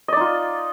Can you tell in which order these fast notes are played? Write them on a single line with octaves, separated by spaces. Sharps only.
D#5 D5 D#4 F4